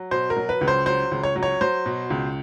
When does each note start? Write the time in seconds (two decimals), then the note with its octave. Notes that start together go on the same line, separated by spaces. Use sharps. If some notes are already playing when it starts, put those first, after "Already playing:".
Already playing: F#3
0.11 B2 C5
0.30 A#4
0.37 F#3
0.49 B4
0.61 C#2
0.68 C5
0.86 F#3 C5
1.11 C#2
1.23 C#5
1.36 F#3
1.43 C#5
1.61 F#3 C5
1.86 B2
2.10 C#2